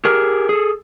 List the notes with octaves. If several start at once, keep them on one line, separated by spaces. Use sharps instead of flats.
G4 G#4 A#4
G#4 A4